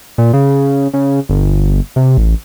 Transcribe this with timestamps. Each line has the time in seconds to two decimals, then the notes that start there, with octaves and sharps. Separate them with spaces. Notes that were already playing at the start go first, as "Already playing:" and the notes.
0.18 A#2
0.33 C#3
0.93 C#3
1.29 G1
1.96 C3
2.18 A1